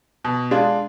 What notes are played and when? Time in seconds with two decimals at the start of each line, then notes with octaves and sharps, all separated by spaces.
0.25 B2
0.51 G#3 D4 F4